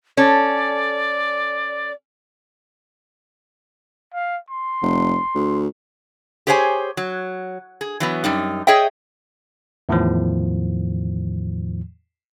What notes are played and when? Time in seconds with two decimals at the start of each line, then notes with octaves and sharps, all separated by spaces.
0.17 C#4 A4 D5
4.14 F5
4.50 C6
4.83 F1
5.35 D2
6.47 G4 G#4 C5 C#5 G5 G#5
6.97 F#3
7.81 G#4
8.00 E3 F#3 B3
8.24 F#2 G3 D#4
8.67 G#4 C#5 D#5 E5 G5
9.89 E2 A2 D#3 F3